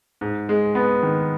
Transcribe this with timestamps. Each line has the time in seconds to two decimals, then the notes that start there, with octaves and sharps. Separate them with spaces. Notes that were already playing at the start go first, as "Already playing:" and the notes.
0.21 G#2
0.49 G#3
0.75 B3
1.03 D#3